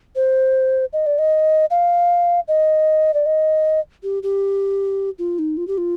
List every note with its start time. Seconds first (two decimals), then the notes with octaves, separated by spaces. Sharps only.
0.15 C5
0.93 D#5
1.06 D5
1.18 D#5
1.70 F5
2.48 D#5
3.14 D5
3.26 D#5
4.03 G4
4.23 G4
5.18 F4
5.39 D#4
5.57 F4
5.67 G4
5.78 F4